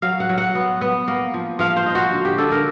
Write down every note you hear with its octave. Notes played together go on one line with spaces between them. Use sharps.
F#3 F5
F#5
F#3
F#5
B3
B3
A#3
F3
F3 F5
C5
D#4
F#4
D3
G4
D3 A4
A#4